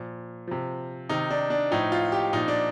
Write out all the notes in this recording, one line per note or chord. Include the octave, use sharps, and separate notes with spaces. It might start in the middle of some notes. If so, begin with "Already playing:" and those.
Already playing: A#2 F3
C3 F3
C3 D#3 D#4
D4
D4
A2 F3 D#4
F4
G4
A#2 F3 D#4
D4